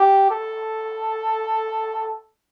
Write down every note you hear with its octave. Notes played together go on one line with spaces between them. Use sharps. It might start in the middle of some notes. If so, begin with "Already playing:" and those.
Already playing: G4
A4